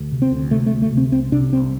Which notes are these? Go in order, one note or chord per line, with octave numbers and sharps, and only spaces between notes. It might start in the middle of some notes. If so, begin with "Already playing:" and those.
Already playing: D2
C3
C4
D2
C3 A3
A3
D2
A3
C3
C4
C2 C4
C3 D4
C2 C4